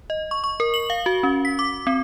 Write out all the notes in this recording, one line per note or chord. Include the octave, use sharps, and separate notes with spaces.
D#5
C#6
C#6
A#4
F#7
F5
F#4
C#4
B6
D6
C4